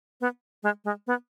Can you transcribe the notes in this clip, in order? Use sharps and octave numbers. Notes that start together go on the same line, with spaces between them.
B3
G#3
G#3
B3